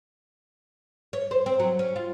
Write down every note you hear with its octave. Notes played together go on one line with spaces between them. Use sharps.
C#5
C5
C4
F#3
C#4
F4